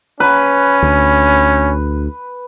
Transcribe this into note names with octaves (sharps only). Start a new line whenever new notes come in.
C#4 B4
D2